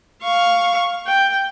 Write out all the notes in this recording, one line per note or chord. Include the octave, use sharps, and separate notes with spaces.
F5 C#6
G5